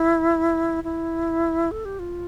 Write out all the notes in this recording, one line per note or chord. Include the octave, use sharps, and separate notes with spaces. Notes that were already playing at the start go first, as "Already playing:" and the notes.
Already playing: E4
E4
A4
G4
F4